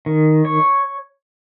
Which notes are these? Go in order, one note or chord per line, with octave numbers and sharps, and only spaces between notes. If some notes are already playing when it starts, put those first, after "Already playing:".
D#3
C#5